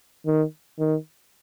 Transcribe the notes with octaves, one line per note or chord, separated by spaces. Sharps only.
D#3
D#3